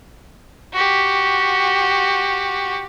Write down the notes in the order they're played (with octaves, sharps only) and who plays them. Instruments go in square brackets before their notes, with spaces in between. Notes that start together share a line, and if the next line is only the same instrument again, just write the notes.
[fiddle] F#4 G4